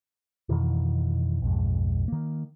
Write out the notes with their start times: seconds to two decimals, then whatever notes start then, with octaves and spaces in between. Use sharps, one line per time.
0.49 F2 B2 D#3 E3
1.42 B1 F2 G#2
2.08 D#3 A#3